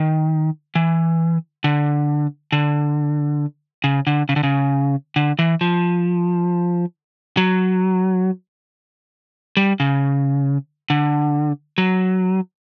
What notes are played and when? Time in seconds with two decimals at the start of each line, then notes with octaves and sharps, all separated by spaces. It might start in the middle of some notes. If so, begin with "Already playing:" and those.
Already playing: D#3
0.75 E3
1.64 D3
2.52 D3
3.84 C#3
4.07 D3
4.29 C#3
4.36 D3
4.43 C#3
5.16 D3
5.39 E3
5.61 F3
7.37 F#3
9.57 G3
9.80 C#3
10.90 D3
11.78 F#3